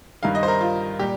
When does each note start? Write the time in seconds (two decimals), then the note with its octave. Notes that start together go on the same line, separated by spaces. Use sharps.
0.23 G2 D#3 G3 F5
0.35 D#5
0.43 C5
0.48 A#4
0.61 F4
0.99 A#2 G3 G4